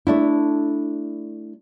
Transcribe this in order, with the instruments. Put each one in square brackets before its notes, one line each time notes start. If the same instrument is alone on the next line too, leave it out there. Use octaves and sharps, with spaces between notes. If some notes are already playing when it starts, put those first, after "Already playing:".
[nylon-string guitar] A3 D4 E4